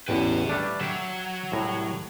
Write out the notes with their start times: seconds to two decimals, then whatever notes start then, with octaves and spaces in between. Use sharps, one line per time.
0.08 A1 E2 B4 D#5 G5
0.49 G3 A3 D4
0.81 F#3 E5 G5
1.52 C2 A2 A#5